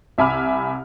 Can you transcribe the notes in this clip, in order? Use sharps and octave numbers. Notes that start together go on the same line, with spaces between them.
C2 E5 G#5 B5 D6 F6